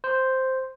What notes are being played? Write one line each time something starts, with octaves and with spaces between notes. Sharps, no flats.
C5